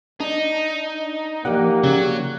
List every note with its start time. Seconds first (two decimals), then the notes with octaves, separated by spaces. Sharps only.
0.20 D4 D#4
1.45 F3 A#3 G4 D5 F#5
1.84 C#3 F#3